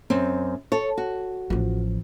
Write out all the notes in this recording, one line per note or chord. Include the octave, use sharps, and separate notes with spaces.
F#2 C4
A4 C#5
F#4
A1 F3